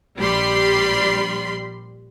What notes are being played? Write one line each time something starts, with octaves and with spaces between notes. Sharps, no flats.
A#1 G3 B5 C6